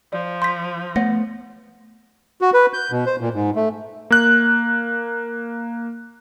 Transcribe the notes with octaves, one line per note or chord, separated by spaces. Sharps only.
F3 D5
C6 G6 B6
A3 B3 C#5 F#5 A#6
F#4
B4
G6
B2
C5
A#2
G#2
A3
A#3 F#6